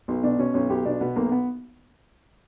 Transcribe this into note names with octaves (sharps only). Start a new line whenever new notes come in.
B1
B2 D4
B2 C#4
B1 C#4
B1 G4
B2 D4
B2 B3
B1 A#3
B3